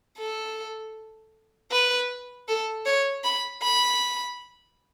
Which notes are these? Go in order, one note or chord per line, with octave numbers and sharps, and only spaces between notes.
A4
B4
A4
C#5
B5
B5